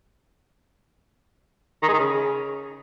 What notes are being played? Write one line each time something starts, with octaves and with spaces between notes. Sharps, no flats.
D#3
G#3
D#3
C#3